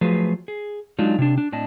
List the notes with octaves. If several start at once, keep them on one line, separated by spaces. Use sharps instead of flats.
F3 F#3 A3 F4 G#4 B4
G#4
F#3 G#3 D4 D#4 F4
C3 D4
D4
A2 C4 D4 D#5 A5